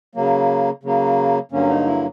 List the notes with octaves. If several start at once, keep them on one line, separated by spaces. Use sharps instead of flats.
C#3 F#3 A#3
C#3 F#3 A#3
G2 D3 F#3 A#3 C#4
D#4
E4